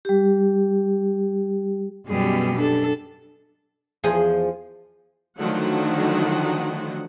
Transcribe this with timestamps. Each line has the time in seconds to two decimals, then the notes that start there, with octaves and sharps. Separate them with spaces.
0.05 G3 G4
2.07 F#2 B2 G3 G4 G#4
2.55 D4 A4
4.04 E2 F3 G#4
5.38 D3 D#3 F3 F#3 A3 F#5